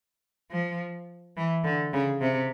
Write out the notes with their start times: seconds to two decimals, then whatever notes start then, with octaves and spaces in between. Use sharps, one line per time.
0.51 F3
1.36 E3
1.64 D3
1.93 C#3
2.21 C3